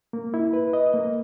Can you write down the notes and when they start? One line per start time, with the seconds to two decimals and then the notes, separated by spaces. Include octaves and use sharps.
0.13 A#3
0.34 E4
0.53 B4
0.73 D#5
0.94 A#3